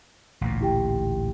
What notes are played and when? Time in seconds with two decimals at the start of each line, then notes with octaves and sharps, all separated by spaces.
0.41 A1 D2 A#2
0.61 E4 G4 G5